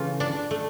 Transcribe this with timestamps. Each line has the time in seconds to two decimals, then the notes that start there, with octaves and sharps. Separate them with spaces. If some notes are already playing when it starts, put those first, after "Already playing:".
Already playing: C#3 E3 A3 F4
0.20 D4
0.51 A3